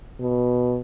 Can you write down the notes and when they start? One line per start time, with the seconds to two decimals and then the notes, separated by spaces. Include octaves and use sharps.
0.20 B2